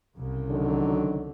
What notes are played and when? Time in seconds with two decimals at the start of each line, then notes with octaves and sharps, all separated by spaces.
0.16 C2 C#3
0.51 D3 D#3 F#3